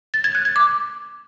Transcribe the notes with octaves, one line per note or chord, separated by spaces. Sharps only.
A6
G#6
F#6
G#6
D6